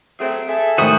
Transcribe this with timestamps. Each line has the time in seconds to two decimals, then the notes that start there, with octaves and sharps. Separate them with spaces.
0.20 F#3 A3 C4 G#4
0.49 G#4 A4 E5
0.78 A2 D#3 F#4 C5 D#6